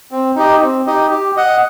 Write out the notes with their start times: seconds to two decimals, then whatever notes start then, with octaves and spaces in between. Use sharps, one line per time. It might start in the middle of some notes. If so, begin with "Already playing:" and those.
0.11 C4
0.36 D#4 G4 D#5
0.61 C4
0.86 D#4 G4 D#5
1.11 G4
1.37 D#5 F#5